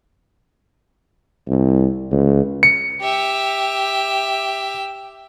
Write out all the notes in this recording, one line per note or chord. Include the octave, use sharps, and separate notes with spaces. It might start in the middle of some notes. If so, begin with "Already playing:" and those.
C2
C#2
C#7
G4 E5